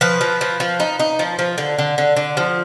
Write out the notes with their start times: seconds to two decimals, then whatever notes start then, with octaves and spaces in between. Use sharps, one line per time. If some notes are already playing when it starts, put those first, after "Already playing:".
0.01 F3 B4
0.21 F3
0.41 F3
0.60 F3
0.80 D#4
1.00 D#4
1.19 F3
1.39 F3
1.58 D3
1.79 D3
1.98 D3
2.17 D3
2.37 F3